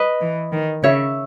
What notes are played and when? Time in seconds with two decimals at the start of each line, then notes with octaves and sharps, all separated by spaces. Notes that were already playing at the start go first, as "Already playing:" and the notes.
Already playing: B4 D#5
0.21 E3
0.52 D#3
0.83 C#3 C#5 E5